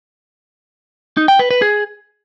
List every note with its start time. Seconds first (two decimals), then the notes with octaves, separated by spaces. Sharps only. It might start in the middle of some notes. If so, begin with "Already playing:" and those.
1.17 D#4
1.28 G5
1.39 B4
1.51 B4
1.62 G#4